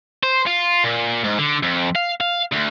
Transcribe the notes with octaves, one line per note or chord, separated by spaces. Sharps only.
C5
F4
A#2
G#2
D3
F2
F5
F5
D2